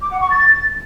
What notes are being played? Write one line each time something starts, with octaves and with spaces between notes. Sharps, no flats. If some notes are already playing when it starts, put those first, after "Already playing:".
D6
F#5
C#6
A6